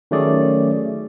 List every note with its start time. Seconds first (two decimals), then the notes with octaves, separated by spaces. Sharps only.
0.11 D#3 F#3 A3 C#4 G#4 D5